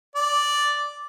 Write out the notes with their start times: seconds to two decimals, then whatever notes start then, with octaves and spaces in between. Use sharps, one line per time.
0.16 D5